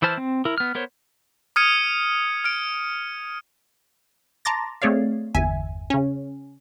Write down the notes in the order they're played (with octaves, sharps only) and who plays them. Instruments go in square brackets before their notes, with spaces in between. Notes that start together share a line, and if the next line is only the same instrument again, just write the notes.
[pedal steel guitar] E3 E4 C5 A5 F6
C4
E4 A#4
B3 F6
B3 A#4 C5 C#5
[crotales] D#6 F6 G#6 C#7 D#7
F6 D7
[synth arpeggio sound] A5 A#5 C6 D6 A6 A#6
A3 C4 G#4 C#5 D5 F5
G1 E2 E5 G#5
C#3 C#4